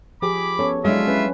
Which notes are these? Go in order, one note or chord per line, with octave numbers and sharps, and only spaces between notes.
F3 G4 G#4 B5 D6
B3 C#4 A4 C#5
F#3 G#3 D4 E4 F4 E5
C#4 B4